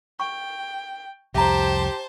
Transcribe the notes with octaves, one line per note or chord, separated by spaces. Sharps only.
G5 C#6
C2 F2 G4 C5 E5 A5 A#5